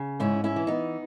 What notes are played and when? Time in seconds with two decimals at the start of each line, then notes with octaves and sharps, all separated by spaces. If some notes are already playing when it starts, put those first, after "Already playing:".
Already playing: C#3
0.20 G#2 C#4 E4
0.44 C#4 E4
0.56 E3
0.67 B3 D#4